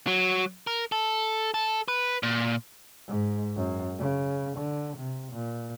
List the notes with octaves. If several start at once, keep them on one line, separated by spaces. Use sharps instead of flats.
F#3
A#4
A4
A4
B4
A#2
G#2
F#2
C#3
D3
C3
A#2